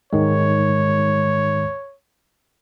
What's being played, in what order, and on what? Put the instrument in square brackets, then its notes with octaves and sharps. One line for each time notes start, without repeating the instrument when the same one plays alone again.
[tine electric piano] G#2 D#3 G#3 [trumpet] C#5